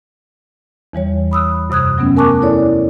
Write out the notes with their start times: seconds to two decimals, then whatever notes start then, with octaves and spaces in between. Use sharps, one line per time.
0.93 E2 E3 G3 C#5
1.31 B5 D#6 E6 F#6
1.70 F#2 C3 D#6 F#6 G#6
1.98 F#3 A3 B3 C#4
2.16 A#4 G#5 A5 C#6 D6 F#6
2.42 E4 A4 C#5 D5